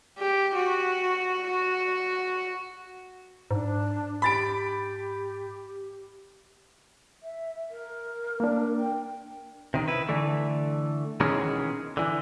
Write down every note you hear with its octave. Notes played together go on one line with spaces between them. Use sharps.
G4
F#4
F#4
G#2 D4
G4 B5 A6 D7
E5
A#4
A#3 D4
G5
C3 D#3
E4 B4
D3 E3 A3
B2 D#3 E3 G#3 C#4 G#4
D3 E3